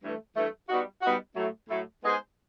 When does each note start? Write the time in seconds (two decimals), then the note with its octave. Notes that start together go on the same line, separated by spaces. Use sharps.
0.02 G2 E3 A3
0.36 G2 E3 A3
0.69 G3 B3 D#4 F#4
1.02 G3 B3 D#4 F#4
1.35 A2 F#3 A3
1.69 A2 F#3 A3
2.02 G#3 B3 D#4 G#4 C5